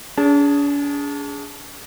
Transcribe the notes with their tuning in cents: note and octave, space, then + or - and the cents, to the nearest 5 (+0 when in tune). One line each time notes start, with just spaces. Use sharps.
D4 -45 G#4 +0 A5 +5